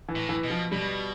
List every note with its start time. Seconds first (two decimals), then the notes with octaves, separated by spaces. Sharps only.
0.09 E3
0.15 A2
0.29 E3
0.44 B2
0.50 F3
0.72 B2 G3